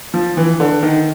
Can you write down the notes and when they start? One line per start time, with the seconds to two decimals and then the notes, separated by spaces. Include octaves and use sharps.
0.14 F3
0.37 E3
0.60 D3
0.83 D#3